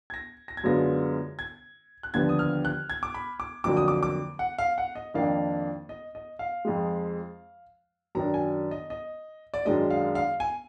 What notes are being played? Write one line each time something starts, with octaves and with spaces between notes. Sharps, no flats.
G#6
A#6
A#6
G#6
F#2 D3 G#3 B3 F4 A#6
G#6
F#6
D#2 D3 F3 B3 G#6
D#6
F6
F#6
G#6
D6
B5
D6
F2 D3 F#3 A#3 D6
D#6
D6
D6
F#5
F5
F#5
D#5
F2 D#3 A#3 D4 F5
D#5
D#5
F5
F2 F3 G#3
F#2 D#3 F#3 D4 A#5
G#5
D#5
D#5
D5
F#2 D#3 G#3 D4 D#5
F5
F5
G#5